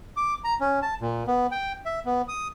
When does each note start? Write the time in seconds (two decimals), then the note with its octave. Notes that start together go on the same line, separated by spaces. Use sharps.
0.17 D6
0.44 A#5
0.60 C#4
0.82 A5
1.01 A#2
1.27 B3
1.51 G5
1.86 E5
2.06 B3
2.28 D#6